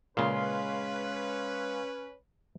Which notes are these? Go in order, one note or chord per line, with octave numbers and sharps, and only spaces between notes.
A#2 C#3 G#3 C#4 B4 F5 C6